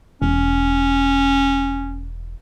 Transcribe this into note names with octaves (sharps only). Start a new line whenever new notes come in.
E1 C#4